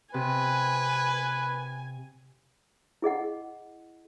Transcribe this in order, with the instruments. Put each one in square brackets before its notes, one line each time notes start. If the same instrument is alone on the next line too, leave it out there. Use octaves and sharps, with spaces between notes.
[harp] C3 [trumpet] B4 [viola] G#5
[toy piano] E4 G#4 D#5 F#5